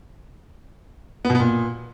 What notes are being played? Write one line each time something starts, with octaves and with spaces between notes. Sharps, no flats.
B3
B2
B3
A#2